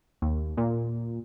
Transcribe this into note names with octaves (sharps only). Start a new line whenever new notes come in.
D#2
A#2